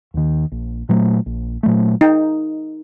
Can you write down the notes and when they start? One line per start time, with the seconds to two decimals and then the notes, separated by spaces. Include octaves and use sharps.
0.14 D#2 D#3
0.52 A#1
0.89 A#2 F#3 A3
1.26 A#1
1.63 A#2 F#3 A3
2.01 D#4